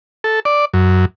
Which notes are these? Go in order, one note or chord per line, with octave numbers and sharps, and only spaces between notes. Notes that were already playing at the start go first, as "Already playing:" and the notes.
A4
D5
F#2